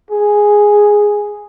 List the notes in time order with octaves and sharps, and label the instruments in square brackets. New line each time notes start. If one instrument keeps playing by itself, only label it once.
[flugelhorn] G#4